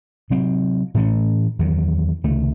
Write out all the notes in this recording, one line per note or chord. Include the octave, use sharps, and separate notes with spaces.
C3 F#3 C4
A2 E3 A3 C#4
E2 D#3 F#3
C#2 C3 D#3 A3